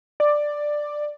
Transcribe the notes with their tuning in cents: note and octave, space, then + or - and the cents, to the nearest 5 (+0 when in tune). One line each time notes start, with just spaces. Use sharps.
D5 +10